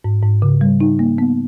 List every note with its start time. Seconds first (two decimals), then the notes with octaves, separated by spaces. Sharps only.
0.04 G#2
0.23 G#2
0.42 C#3
0.61 G3
0.81 D#4
0.99 A#3
1.18 B3